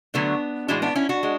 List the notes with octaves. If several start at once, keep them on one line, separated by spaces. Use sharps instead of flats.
D3 F#3 A3 B3 D4
A2 E3 G#3 D4 F#4
B3 D4
C#4 E4
D4 F#4
G#3